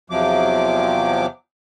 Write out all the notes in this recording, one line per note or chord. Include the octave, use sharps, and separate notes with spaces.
E2 C3 F3 F#3 D6